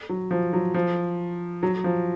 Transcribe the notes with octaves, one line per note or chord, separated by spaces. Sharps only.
F#3
F3
F#3
F3
F#3
F3